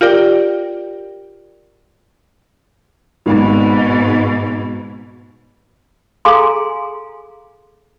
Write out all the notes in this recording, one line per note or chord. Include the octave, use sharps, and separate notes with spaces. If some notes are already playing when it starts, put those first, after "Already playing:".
F4 G4 A#4 D5 G5
G#1 G#2 B2
G#4 A4 F5 G#5 A#5 C6